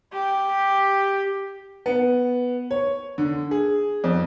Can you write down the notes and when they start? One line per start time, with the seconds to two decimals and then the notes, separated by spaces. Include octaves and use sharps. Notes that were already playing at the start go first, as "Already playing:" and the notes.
0.13 G4
1.86 B3
2.71 C#5
3.18 D3
3.51 G#4
4.04 F2